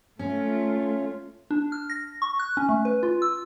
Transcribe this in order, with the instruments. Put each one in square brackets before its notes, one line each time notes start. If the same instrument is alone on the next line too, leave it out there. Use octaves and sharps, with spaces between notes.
[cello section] A3 F4 [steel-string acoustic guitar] C#4
[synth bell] D4
F6
A#6
C#6
F#6
C#4
A3
B4
F4
E6